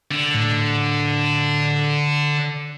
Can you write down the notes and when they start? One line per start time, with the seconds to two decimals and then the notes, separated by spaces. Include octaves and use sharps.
0.11 D3
0.35 A2